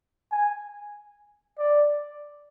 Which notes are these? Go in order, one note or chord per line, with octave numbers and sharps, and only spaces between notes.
G#5
D5